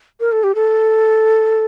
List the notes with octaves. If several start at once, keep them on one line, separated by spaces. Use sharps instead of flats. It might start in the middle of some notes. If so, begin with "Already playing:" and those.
A#4
A4
G4
A4